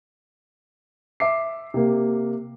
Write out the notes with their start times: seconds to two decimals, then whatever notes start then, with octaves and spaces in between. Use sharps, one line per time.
1.20 E5 D6 C7
1.74 C3 A#3